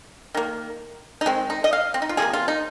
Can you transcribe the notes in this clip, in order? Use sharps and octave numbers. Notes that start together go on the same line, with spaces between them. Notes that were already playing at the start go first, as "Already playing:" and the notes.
D#3 A#3
D#4
D#3 G#3 C4
D#4
D#5
F5
C4
D#4
F4
C3 F3 A#3 G#4
F4
D#4